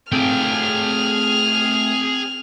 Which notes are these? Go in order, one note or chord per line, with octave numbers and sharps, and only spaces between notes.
A3 C4 F4 G#4 G5 F6